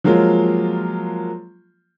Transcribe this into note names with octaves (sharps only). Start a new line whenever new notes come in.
F3 F#3 G#3 A#3 F4